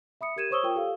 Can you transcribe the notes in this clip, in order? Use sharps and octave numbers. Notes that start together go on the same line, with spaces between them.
E5 B5 D#6 C#7
G4 A#4 G#6 D#7 E7
C5 C#5 C#6 D#6 E6 G7
F4 A#4 G5 D#6
G4 A4 F5